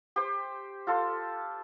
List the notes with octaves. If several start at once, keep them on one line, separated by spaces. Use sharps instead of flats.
G4 C5
F4 A4 C6